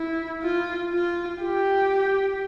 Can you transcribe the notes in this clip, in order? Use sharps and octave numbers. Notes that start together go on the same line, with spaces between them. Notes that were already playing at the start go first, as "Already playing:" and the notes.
Already playing: E4
F4
F4
G4